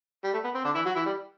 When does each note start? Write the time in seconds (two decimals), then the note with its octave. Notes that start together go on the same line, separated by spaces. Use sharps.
0.24 G3
0.33 A3
0.44 B3
0.55 C4
0.65 D3 D4
0.75 E3 E4
0.85 F#3 F#4
0.95 E3 E4
1.06 G3